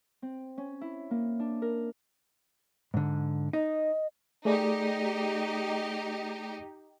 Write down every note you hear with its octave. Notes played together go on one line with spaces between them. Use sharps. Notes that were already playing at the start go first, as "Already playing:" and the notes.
C4
C#4
E4
A#3
D4
A#4
G#2 D3
D#4 D#5
A3 D#4 G4 G#4 D5